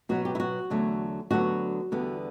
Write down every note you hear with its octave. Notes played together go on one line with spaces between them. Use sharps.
B2 F#3 B3 F#4
G4
E4
F#4
E2 D3 F#3 A3
D2 D3 F#3 B3 F#4
E2 D3 G3 B3